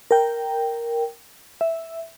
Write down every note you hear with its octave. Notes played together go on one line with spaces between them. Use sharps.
A#4 G5
E5